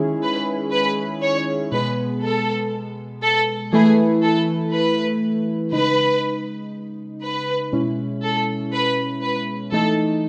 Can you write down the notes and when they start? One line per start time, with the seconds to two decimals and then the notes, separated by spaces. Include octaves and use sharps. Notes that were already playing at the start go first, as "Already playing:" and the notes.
Already playing: D#3 G#3 C#4 E4 G#4
0.22 B4
0.72 B4
1.22 C#5
1.72 B2 G#3 B3 B4
2.23 A4
3.22 A4
3.73 E3 A3 E4 G#4 B4
4.23 A4
4.73 B4
5.72 C#3 G#3 D#4 B4
7.22 B4
7.72 B2 G#3 C#4 E4
8.23 A4
8.73 B4
9.22 B4
9.72 E3 A3 D#4 A4